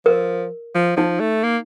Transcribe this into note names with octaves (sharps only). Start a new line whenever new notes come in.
F3 A#4
F3
F3 D#4
A3
A#3